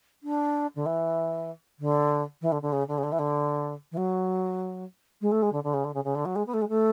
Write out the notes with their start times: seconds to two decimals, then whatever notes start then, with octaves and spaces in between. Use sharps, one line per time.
0.23 D4
0.76 D3
0.86 E3
1.79 D3
2.41 E3
2.52 D3
2.62 D3
2.72 C#3
2.88 D3
2.98 C#3
3.03 D3
3.12 E3
3.19 D3
3.92 E3
3.97 F#3
5.21 G#3
5.32 A3
5.42 G#3
5.53 D3
5.64 D3
5.74 C#3
5.84 D3
5.94 C#3
6.04 C#3
6.15 D3
6.25 F#3
6.36 G#3
6.47 B3
6.54 A3
6.62 G#3
6.69 A3